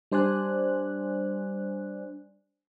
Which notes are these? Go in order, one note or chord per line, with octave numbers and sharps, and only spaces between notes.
G3 D4 C5 D5 G#5 F#6